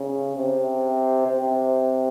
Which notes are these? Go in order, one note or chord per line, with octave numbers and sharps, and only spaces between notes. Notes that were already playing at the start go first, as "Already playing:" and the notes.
Already playing: C#3
C3
C3